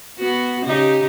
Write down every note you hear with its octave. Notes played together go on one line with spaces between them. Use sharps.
B3 F#4
C#3 D#4 G4